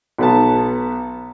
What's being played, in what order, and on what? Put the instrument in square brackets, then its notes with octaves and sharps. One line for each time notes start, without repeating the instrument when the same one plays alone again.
[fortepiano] B1 B3 A5